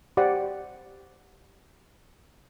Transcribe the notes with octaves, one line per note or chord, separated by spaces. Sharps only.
G4 C5 D5 F#5